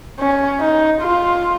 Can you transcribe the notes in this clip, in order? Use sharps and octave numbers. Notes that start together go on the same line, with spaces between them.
C#4
D#4
F4